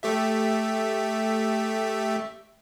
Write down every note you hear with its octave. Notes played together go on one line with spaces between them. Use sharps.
A3 G4 E5